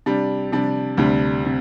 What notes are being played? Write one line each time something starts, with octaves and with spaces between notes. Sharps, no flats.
C3 G3 D4
C3 G3 D4
D2 C3 G3 D4
C3